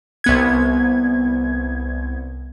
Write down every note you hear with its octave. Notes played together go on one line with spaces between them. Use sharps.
C2 B3 G#6